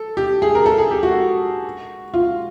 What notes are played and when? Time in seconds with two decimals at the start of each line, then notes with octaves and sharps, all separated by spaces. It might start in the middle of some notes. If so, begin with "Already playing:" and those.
Already playing: A4
0.17 G4
0.42 G#4
0.55 A#4
0.66 A4
0.78 G#4
0.91 G4
1.03 F#4
2.14 F4